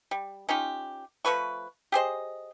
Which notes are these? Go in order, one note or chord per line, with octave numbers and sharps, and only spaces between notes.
G3
C#4 D#4 F4 G4
F3 A3 B4 C#6
G4 G#4 C5 D#5